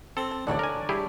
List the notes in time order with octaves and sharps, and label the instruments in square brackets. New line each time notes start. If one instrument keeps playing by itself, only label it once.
[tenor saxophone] C4 [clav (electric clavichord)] A4
[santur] A5
[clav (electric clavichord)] A1 D2 G#2 [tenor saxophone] D3 [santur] D4 C#5 D5
[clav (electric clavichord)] A#4 G#5
[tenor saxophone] G3 [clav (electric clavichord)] E4 G4 G#4